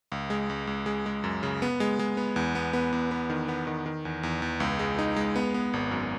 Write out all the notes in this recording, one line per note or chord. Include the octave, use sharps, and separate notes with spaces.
C#2
G#3
C#2
C#2
G#3
G#3
F#2
C#3
B3
G#3
G#3
B3
E2
B3
B3
E2
B3
D#3
B3
D#3
D#3
E2
E2
E2
C#2
G#3
D#4
G#3
B3
B3
G#1
F#2